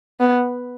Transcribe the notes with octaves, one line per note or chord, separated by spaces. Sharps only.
B3